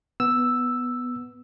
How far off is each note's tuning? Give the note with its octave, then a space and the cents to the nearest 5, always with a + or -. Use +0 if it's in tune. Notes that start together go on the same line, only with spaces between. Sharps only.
B3 +0 E6 +0